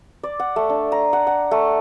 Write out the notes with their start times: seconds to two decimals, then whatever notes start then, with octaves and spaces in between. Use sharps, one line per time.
0.23 D5
0.39 F#5
0.56 A3
0.69 D4
0.92 A#5
1.13 F#5
1.27 F#5
1.51 A3